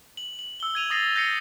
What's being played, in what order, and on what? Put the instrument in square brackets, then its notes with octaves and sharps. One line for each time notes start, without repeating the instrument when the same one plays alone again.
[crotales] F#7
F#7
E6 G7
G#6 D#7 F7
D#6 A6 A#6 C7 D#7
G6 A#6 C7 C#7